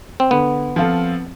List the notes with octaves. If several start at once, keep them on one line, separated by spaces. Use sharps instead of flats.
C4
D3 B3
F3 C4 F4 A4